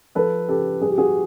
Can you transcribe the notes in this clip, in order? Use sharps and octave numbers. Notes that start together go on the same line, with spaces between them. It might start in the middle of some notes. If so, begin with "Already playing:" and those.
F3 A4 B4
C#3 G4 A4
G3 G#4
G4
F#4 G#4